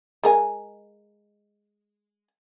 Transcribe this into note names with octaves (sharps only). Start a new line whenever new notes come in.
G#3 A#4 G#5